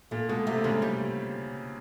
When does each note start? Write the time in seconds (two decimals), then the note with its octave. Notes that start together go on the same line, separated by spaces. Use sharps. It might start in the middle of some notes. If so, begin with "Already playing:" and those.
0.11 A#2 A3
0.29 B2 G#3
0.47 C3 A3
0.58 C3
0.64 C#3 G#3
0.82 G3